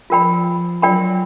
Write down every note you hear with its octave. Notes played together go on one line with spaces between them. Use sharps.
F3 F4 A#4 D5 G5 B5
F#3 F4 A#4 D5 G5 B5